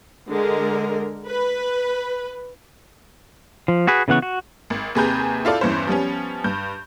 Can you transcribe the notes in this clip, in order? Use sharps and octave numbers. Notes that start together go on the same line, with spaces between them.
D3 G#3 A#4
B4
F3
F#4 G#4 B4
C#3 E3 B3 F#5 C#6
F#4
G#1
D#2 C3 G#4 B4 A#5 G6
E4 F4 A4 D5
E2 G2 E3 C#4 C5
F3 G3 B3 C#4
G2 G6